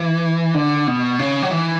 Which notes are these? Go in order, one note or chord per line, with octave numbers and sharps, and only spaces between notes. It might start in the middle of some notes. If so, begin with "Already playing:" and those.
Already playing: E3
D3
B2
C#3
F#3
E3